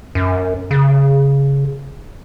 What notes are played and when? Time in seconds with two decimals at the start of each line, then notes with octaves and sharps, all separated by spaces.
0.15 F#2
0.71 C#3